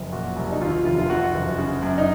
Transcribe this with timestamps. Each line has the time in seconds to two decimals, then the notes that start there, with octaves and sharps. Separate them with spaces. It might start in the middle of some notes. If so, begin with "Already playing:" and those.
Already playing: F#1 F2
0.12 A#2 F#4
0.36 C2
0.52 D#4
0.61 D#2 F4
0.85 F1 F4
0.98 F4
1.10 F2 F#4
1.35 F#1
1.58 C#3
1.82 F#2
1.98 D#4